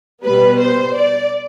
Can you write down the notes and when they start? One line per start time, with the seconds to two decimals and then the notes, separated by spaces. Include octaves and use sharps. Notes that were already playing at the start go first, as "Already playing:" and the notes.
0.23 B2 G3 B3 B4
0.59 C5
0.95 D5